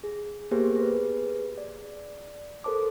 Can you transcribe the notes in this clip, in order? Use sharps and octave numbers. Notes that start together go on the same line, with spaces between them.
G#4
A#3 B3 G4 G#4 A#4 C5
G#4 B4
D5
A4 A#4 C5 A5 D6